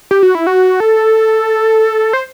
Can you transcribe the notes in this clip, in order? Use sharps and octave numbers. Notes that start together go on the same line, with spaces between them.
G4
F#4
E4
F#4
A4
C5